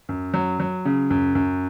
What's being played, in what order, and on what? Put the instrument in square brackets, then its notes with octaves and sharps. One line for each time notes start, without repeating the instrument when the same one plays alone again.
[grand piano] F#2
F#3
F#3
C#3
F#2
F#2